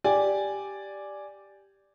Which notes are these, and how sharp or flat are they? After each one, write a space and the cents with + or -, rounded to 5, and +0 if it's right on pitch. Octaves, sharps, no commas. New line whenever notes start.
G4 +0 D5 +0 G#5 +0